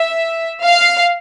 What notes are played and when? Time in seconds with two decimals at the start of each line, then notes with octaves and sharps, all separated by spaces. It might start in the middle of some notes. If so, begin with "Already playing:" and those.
Already playing: E5
0.64 F5